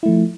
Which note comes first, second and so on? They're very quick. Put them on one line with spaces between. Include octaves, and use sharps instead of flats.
E4 A3 F3